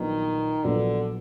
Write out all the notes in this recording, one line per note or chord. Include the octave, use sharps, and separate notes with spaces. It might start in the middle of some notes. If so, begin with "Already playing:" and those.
Already playing: A#1 A#2 D#3 F#3 B3 D4
A#1 A#2 D3 F#3 B3 D4